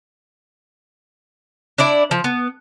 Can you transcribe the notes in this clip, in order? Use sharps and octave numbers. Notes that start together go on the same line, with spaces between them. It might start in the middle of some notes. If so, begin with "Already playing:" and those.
D4 E4 D5
F3
B3